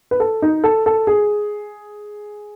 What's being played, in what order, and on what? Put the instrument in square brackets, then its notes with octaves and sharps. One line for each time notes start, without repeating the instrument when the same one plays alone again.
[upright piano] B4
A4
D#4
A4
A4
G#4